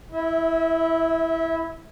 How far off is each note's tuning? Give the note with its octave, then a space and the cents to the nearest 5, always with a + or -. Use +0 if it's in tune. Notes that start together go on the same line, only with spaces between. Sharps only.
E4 +0 E5 -30